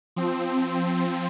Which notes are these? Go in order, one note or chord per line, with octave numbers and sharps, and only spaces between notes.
F3 C4